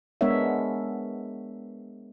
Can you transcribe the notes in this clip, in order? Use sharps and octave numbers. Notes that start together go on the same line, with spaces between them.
G#3 B3 D4 A#4 C#5 E5